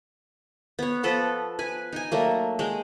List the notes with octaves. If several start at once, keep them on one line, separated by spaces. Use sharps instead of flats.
B3 C#5
F3 B3 A4 B4
B4 G#5
D#4 G#5
F#3 A3 A#3
G#3 G5